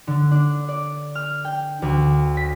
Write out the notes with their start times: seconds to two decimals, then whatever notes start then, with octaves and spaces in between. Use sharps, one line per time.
0.07 D3
0.31 D4
0.68 D5
1.15 F6
1.45 G5
1.82 D2
2.37 B6